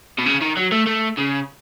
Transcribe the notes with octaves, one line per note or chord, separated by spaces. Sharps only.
B2
C#3
D#3
F#3
A3
A3
C#3